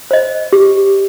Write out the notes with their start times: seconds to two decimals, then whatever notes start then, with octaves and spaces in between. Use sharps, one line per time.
0.11 C5 D#5
0.53 G4